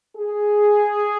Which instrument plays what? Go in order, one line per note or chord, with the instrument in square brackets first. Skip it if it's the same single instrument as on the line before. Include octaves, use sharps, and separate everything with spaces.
[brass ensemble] G#4